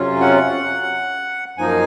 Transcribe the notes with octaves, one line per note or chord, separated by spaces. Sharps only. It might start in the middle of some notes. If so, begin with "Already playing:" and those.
Already playing: F2 C3 F#3 C#4 F4
F#5
F#2 F3 A#3 D#4 G#5